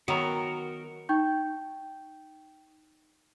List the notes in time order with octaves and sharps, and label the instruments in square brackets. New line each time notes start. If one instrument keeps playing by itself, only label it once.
[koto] D#3 F#3 B3 [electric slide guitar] F#4 A#4
[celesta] D#4 G5 C#6 G6